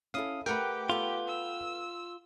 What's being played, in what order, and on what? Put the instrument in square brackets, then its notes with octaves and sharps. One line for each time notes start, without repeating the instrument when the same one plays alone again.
[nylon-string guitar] C#4 E4 A4 [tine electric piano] F5 D#6
[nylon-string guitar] A3 A#4 [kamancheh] G4 [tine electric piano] B4 F#5 G5
[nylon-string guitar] B3 A4 [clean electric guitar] F4
[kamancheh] E6